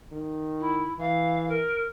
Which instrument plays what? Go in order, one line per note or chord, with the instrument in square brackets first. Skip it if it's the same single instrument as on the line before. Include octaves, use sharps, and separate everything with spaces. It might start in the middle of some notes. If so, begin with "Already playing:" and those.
[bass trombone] D#3
[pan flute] E4
[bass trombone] E3 [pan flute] F5
[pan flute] A#4